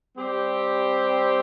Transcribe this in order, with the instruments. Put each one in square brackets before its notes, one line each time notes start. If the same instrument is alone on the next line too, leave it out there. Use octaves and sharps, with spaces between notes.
[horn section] G3 C4 G4